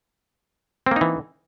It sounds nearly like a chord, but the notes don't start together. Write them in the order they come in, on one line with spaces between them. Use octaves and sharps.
C4 A#3 D#4 E3